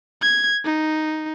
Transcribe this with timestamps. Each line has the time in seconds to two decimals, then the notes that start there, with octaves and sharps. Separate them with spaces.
0.22 G#6
0.65 D#4